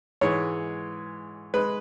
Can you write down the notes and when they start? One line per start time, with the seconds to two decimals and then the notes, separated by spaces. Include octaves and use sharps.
0.21 G#2 E3 G#3 C#5
1.54 G#3 B4